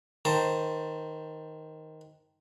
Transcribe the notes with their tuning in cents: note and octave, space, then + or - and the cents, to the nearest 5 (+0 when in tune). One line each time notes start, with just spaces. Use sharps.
D#3 +10 C5 +0 A5 +15